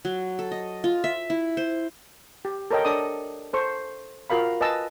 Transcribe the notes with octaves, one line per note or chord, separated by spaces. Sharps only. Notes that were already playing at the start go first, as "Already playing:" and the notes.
F#3
A4
D#5
F4
E5
E4
C5
G4
A4 A#4 C#5 D#5 G5
D4 A4 D5 D#6
A4 C5 C#6
F4 F#4 A#4 F5 B5
B4 D#5 G#5 A5 E6